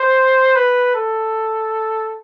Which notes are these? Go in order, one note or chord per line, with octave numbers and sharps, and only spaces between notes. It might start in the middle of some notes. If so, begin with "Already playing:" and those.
Already playing: C5
B4
A4